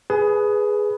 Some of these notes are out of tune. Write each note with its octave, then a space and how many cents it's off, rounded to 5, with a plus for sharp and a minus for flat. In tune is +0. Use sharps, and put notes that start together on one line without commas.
G#4 +0 B4 +0 G#5 +35